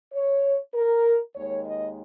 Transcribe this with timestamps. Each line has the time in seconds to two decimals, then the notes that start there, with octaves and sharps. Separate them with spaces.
0.13 C#5
0.74 A#4
1.36 D#2 D#3 G#3 C#5
1.67 D#5